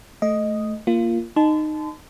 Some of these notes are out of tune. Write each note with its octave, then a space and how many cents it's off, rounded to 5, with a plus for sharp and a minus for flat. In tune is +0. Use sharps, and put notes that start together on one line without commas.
A3 -10 D#5 +0
A#3 +0 F4 -15
D#4 -15 A5 -20 C6 -40